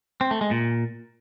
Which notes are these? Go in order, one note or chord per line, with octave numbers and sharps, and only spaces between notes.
C4
A3
G#3
A#2